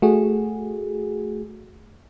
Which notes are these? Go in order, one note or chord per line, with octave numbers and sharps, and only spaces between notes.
A3 F#4 G#4